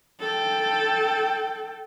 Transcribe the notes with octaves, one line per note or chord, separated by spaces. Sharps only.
A4 G5